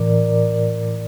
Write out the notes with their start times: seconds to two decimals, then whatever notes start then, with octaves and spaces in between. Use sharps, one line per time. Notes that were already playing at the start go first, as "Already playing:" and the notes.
Already playing: A2 E3 A#4 D5